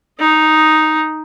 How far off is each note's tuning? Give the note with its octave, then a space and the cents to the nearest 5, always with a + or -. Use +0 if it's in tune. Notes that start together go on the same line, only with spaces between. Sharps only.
D#4 +0 D#5 +0